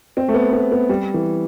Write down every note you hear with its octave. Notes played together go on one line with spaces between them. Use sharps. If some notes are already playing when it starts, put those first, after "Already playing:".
C4
A3
B3
B3
B3
G3
E3